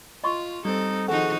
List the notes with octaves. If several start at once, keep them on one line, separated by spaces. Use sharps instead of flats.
F4 D#5 C6 C#6
G3 C4 D#4 A4
D#3 F3 D#4 F#4 G#4 A4 F#5